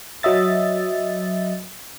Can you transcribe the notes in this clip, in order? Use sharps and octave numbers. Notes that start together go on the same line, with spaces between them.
F#3 D#5 E5 A6